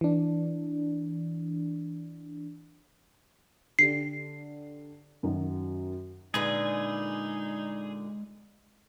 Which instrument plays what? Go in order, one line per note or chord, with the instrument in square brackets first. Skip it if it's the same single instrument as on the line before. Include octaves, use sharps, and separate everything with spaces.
[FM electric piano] E3 D4
[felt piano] D3 G4 [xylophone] C7
[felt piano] F#2 D#3 F#3
[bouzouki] A#2 D3 B4 [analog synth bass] G#3 [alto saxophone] D#4 [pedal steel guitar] G#4